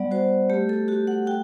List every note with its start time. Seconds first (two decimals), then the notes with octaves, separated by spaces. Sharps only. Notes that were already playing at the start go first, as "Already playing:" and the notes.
Already playing: G3 B3 D5 F#5
0.11 F#4 C5
0.50 A3 G4
0.69 A4
0.88 F#4 G4
1.07 F#5
1.27 F#4 G5